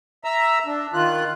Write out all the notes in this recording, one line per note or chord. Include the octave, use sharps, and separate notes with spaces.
E5 A#5 E6
D4
D#3 F4 F#6